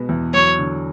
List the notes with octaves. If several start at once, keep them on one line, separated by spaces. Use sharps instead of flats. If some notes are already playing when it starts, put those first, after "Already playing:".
Already playing: B2 G#3 B3
E2
F#3 C#5
D3